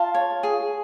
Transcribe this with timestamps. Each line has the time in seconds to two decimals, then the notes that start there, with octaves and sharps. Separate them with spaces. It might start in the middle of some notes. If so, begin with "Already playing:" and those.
Already playing: F4 A5
0.14 C#5
0.43 G#4